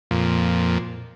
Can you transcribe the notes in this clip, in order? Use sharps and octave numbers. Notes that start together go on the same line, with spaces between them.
F2 A#2